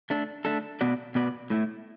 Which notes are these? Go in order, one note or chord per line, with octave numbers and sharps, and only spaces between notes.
A3 D4 A4
A3 D4 A4
B2 B3 F#4 D5
B2 B3 F#4 D5
A2 A3 E4